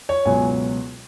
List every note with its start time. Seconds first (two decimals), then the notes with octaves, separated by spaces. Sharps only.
0.09 C#5
0.25 C#2 B2 F#3 G#5